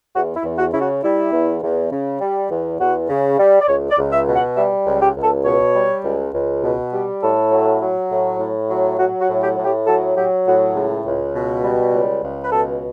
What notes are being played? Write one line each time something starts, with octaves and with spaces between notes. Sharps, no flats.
E2 F#4
E4
E2
F#4
C#3 E4
F#4
G3 E4
E2
E2
C#3
G3
E2
E2 F#4
C#3
G3
D5
C#2 C#5
D5
C#2
E5
B2
F#5
G3 E5
C#2
G4
C#2
A4
B2 C#5
G3
C#2
C#2
B2
G3
A2 A4
F#3
F#3
A2
A2
F#3
F#3 F#4
F#4
A2
G4
A2
G4
F#3 A4
F#3 G4
A2 F#4
C#2
C#2
B2
G3
C#2
C#2
B4
B2 A4